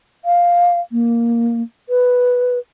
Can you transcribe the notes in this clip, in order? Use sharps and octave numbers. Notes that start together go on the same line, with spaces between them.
F5
A#3
B4